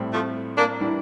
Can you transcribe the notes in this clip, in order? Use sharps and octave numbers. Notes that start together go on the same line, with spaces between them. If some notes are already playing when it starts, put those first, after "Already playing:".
Already playing: A2 G3 C4
F3 A3
A#3 D4
E3 G3 D4